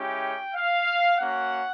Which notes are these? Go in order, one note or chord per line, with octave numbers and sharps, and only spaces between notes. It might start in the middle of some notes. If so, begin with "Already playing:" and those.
Already playing: G#3 C#4 E4 G4 G5
F5
A#3 C#4 F#4 F#5